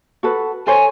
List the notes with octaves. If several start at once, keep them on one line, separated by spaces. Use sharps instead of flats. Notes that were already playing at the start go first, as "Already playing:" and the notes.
F#4 A4 B4
A4 C5 C#5 G#5